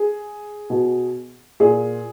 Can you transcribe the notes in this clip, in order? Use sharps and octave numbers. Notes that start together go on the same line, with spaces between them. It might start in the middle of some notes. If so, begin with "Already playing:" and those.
Already playing: G#4
B2
A#2 G#4